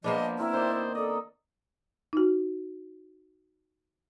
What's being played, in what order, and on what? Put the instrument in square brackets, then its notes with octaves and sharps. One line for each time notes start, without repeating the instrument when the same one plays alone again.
[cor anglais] F3 [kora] A#3 B3 D4 [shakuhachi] D#5
[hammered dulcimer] C4 A#4 [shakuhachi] E4
[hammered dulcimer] D#3 D5 [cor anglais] C5
[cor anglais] C5
[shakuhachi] A4 [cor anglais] D5 [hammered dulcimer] D#5
[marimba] D#4 F#4